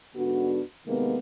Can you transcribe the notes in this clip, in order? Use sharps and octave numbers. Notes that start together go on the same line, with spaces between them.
G#2 D3 B3 D4 F#4
C3 D#3 G#3 A#3 B3